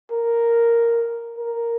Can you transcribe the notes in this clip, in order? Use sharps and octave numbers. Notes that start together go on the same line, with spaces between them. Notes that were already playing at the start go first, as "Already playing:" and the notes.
A#4
A#4